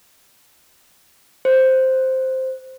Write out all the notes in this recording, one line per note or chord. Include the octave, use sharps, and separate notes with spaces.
C5